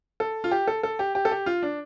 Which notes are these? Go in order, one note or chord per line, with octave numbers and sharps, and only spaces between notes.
A4
F4
G4
A4
A4
G4
G4
A4
G4
F4
D4